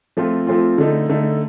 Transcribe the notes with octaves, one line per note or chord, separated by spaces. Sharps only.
F3 A3 C4 F4
F3 A3 C4 F4
D3 A3 D#4
D3 A3 D#4